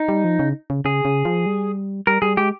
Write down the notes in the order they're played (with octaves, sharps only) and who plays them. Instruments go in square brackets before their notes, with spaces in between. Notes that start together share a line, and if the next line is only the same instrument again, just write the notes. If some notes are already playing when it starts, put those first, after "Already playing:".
Already playing: [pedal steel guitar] D#4
[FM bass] G3
F3
C#3
C#3
[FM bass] C#3 [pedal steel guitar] G#4
[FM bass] C#3
F3
G3
[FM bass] G3 [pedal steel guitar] A#4
[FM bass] G3 [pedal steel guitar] G#4
[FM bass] G#3 [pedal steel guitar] G4